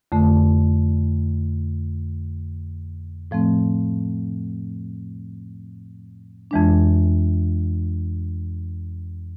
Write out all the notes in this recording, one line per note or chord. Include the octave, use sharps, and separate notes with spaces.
F2 D3 A3
A2 F3 A3 C4
F2 E3 G#3 D4